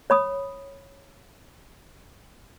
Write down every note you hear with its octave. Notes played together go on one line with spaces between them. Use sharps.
C#5 B5 D#6